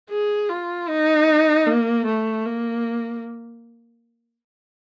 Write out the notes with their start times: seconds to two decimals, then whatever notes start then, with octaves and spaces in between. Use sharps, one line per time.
0.10 G#4
0.49 F4
0.89 D#4
1.67 A#3
2.06 A3
2.46 A#3